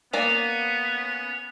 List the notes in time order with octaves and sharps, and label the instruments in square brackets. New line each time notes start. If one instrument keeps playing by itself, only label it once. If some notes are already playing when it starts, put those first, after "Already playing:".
[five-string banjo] A#3 D5 [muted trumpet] B3 [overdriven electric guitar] C#4